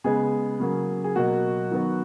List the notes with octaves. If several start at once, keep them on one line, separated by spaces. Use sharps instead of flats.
C#3 G#3 B3 G#4
C#3 F#3 A#3
G#4
B2 F#3 A#3 F#4
D#3 F#3 B3